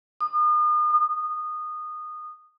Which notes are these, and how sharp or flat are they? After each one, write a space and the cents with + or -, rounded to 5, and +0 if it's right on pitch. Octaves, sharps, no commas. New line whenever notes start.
D#6 -40
D#6 -20